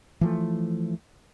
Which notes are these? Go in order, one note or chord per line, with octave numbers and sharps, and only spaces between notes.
E3 F3 A3